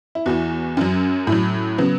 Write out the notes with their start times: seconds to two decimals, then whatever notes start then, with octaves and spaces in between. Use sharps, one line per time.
0.15 E4
0.26 E2 E3 F#4
0.77 F#2 F#3 C#4
1.27 A2
1.32 F#3
1.78 C#3 F#3 B3